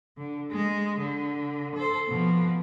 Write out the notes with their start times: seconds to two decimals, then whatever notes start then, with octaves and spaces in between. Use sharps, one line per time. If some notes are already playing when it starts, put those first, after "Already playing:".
0.17 D3
0.51 G#3
1.00 D3
1.75 A4 C5
2.08 B2 F3